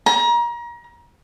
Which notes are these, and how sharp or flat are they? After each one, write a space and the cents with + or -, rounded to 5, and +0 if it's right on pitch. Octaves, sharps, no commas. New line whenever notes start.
A#5 +30